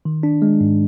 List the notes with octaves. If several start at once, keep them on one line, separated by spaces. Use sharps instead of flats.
D#3
D4
G#3
G#2